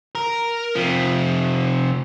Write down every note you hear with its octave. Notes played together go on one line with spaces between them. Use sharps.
A#4
C3 F3